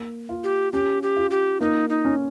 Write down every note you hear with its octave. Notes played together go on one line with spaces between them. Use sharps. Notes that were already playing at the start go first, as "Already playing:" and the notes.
Already playing: A#3
F4
G4
C#4 G4
G4
F4
G4
A#3 D#4
D#4
C#4